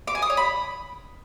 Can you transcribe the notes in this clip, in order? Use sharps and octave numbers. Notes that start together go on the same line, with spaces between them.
D6
G#5
D#6
C#5
B5